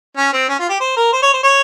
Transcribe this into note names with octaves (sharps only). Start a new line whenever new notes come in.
C#4
C4
C#4
F4
G4
C5
A#4
C5
C#5
C5
C#5